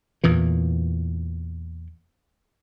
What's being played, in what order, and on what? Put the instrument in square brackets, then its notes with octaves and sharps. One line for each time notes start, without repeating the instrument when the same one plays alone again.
[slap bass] E2 A#2 E3